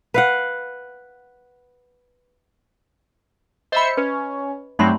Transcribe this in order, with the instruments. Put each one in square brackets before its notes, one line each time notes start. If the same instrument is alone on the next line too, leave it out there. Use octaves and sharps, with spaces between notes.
[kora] B4 F5 F#5
[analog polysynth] C5 E5 C#7 [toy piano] D#5 B5
[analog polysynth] C#4 [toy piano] B4
[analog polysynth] G2 F#3 C4 [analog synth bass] A3 [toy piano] D#4 B5 C6